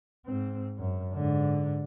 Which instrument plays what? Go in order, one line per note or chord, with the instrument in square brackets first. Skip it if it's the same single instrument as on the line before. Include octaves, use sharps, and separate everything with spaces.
[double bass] G#2 C4
F#2
G#2 D3